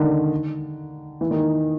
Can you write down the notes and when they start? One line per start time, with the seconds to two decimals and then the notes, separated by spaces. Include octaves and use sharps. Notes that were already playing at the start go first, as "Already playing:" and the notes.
Already playing: D3 D#3
1.21 E3
1.31 D#3